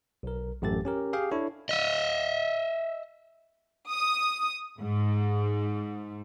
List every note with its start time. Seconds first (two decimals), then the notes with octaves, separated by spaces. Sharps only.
0.23 B1 A#4
0.62 A1 F#2 A3 G4 A4 A6
0.85 C#4 G4 A#4
1.13 G4 G#4 F5 G5
1.32 D4 E4 A4 C#5
1.69 D#5 E5
3.90 D#6
4.79 G#2